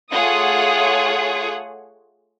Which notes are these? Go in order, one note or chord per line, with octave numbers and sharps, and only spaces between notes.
A3 F4 G#4 C#5 F#5 D#6